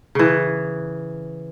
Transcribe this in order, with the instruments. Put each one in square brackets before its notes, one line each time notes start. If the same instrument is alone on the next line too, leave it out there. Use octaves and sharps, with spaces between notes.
[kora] C#3 E3